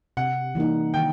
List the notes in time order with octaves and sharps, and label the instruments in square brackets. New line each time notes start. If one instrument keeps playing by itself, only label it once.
[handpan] C3 [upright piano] F#5
[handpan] E3 G3 A#3 D#4
[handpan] D#3 [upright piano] G5